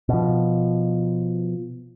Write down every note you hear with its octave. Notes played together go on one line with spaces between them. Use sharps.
B2 F3